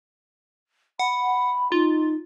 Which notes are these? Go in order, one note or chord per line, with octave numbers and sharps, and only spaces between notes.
F#5 B5
D#4 F4